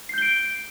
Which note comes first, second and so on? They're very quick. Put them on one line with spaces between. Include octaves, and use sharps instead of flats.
C7 G6 G7 D7